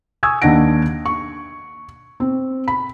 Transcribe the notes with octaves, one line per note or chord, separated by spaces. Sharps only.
G#5 C#6 D#6 E6 G#6
D#2 D4 D#5 F#5 A#6 D7
C#6
C4
B5